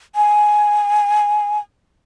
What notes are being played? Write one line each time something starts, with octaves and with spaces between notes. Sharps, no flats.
G#5